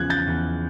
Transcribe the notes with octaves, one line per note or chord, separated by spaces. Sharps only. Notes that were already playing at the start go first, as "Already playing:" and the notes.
Already playing: E2 C#3 F3 F#6 G#6
G6 A6
E2